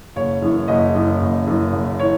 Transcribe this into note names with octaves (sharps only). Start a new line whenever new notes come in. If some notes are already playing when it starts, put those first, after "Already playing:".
F#1 C#5
F#2 E3
F#1 D#5
F#2 E3
F#1
F#2 E3
F#1
E3 C#5